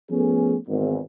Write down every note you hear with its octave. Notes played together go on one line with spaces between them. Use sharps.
F3 A3 B3 C#4 G#4 A4
G#1 E2